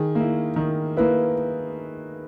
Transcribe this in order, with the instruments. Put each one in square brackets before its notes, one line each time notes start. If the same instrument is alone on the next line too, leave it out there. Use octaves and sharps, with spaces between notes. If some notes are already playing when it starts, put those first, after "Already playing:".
Already playing: [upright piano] D#3 [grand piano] G#4
[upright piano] A#3 E4
[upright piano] D#3 [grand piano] A#4
[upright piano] A#3 E4 [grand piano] B4